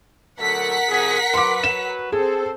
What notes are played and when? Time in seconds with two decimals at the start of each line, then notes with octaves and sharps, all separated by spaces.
0.40 D2 F#3 A4 A#4 F#5 B6
0.89 F2 C3 G#4
1.34 F#3 B4 C6 D6
1.64 E7
2.12 C4 G#4 A4 C5